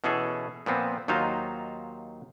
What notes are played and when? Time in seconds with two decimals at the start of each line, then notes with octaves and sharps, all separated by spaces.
0.04 B2 E3 C#4 G#4 A4
0.66 A#2 F3 B3 C4
1.08 D#2 F#3 D#4 F4 C5 F5